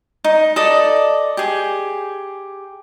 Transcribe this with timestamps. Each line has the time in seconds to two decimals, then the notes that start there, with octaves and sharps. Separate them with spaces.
0.24 D#4
0.56 A4 D5 D#5
1.37 G4 G#4